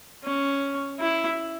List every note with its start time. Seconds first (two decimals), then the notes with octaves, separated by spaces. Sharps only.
0.24 C#4
1.00 E4